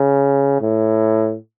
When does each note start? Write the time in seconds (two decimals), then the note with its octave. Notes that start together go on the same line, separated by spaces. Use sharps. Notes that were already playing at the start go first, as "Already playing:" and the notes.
Already playing: C#3
0.62 A2